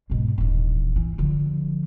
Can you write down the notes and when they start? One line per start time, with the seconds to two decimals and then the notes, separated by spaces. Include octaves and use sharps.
0.10 G#2 B2
0.38 D#1 E3
0.96 E3
1.18 D3 F3